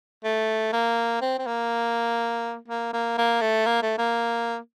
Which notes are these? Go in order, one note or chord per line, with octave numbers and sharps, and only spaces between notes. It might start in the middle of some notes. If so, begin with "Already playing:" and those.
A3
A#3
C4
C4
A#3
A#3
A#3
A#3
A3
A#3
A3
A#3